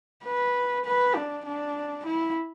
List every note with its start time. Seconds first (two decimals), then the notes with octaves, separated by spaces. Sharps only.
0.24 B4
0.85 B4
1.15 D4
1.46 D4
2.06 E4